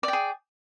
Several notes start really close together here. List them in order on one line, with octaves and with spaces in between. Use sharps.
D5 G5 G#4